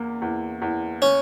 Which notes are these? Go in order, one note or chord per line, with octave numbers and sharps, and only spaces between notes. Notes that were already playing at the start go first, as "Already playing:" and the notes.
Already playing: E2 A#3
E2
E2
C#4